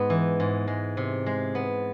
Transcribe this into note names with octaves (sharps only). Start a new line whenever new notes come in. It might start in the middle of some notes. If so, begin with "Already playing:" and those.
Already playing: G#2 G#3 B3
E3
G#2
G#3
C3
G#3
B3